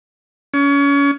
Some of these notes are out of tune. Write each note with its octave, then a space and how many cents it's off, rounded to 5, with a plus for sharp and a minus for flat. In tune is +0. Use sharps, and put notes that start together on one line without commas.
C#4 +30